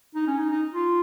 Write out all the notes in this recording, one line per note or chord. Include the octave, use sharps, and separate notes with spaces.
D#4
C#4
D#4
D#4
F4